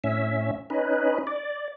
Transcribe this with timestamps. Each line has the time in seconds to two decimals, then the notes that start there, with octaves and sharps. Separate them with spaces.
0.04 A2 C#4 E5
0.70 C#4 D#4 B4
1.27 D5